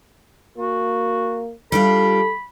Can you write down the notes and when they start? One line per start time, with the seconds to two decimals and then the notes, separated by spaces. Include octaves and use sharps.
0.57 A#3 F#4
1.72 G3 D4 F4 A4 B5